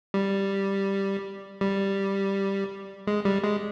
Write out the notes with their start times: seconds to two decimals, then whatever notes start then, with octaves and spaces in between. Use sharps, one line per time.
0.14 G3
1.61 G3
3.07 G#3
3.25 G3
3.44 G#3